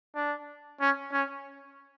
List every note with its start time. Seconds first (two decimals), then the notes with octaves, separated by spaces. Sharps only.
0.16 D4
0.81 C#4
1.13 C#4